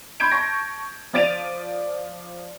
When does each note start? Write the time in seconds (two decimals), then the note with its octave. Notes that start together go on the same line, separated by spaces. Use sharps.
0.20 B5 C6 G6 G#6 D7
0.31 A5 C#6 A#6
1.13 F3 D5 A6 D7 D#7 F7